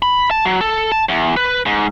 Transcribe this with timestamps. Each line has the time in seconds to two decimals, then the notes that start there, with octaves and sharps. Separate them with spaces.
0.02 B5
0.31 A5
0.45 F#3
0.61 A4
0.92 A5
1.09 E2
1.37 B4
1.66 G#2